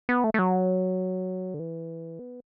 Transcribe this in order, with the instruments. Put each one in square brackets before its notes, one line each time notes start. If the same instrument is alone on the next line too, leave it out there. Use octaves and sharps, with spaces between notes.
[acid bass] B3
A3
A3
F#3
D3
E3
B3